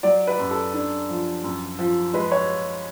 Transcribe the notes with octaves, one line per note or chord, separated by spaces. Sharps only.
F#3 D5
B4
F#2
A4
D4
F3
F#2
F3
G#3 B4
C#5